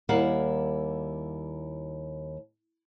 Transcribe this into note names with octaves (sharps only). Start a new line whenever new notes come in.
D#2 G3 E4 A#4 F5 F#5